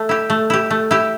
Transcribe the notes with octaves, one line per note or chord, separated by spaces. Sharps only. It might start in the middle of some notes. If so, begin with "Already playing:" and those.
Already playing: A3
E4 G4
A3
E4 G4
A3
E4 G4